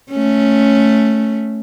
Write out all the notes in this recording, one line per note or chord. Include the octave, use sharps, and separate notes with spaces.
A3 C#4